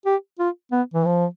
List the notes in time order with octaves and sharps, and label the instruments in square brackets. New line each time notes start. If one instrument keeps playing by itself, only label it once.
[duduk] G4
F4
B3
E3
F3